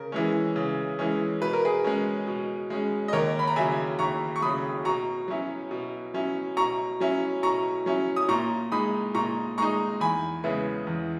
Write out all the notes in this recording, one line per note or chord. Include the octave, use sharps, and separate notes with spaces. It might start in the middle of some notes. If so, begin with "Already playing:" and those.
Already playing: C#3 A#4
E3 G#3 C#4
C#3
E3 G#3 C#4
B2 B4
A#4
G#4 B4
G#3 C#4
B2
G#3 C#4
D#5
D#2 A#4 C#5
B5
A#5
C#3 F#3 E5 G#5
D#2 A#5 C#6
C#6
C#3 F#3 B5 D#6
B2 A#5 C#6
F#3 C#4 E4
B2
F#3 C#4 E4
B2 A#5 C#6
F#3 C#4 E4
B2 A#5 C#6
F#3 C#4 E4
D#6
A#2 A#5 C#6
G#3 D#4 B5 D#6
A#2 A#5 C#6
G#3 D#4 A#5 C#6
E2 G#5 B5
C#3 G#3 B3 E4
E2